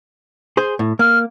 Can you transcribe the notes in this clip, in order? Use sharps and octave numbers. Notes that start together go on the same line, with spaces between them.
G#4 C5
A2
A#3 F6